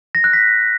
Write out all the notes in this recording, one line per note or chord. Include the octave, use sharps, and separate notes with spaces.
A#6
F#6
B6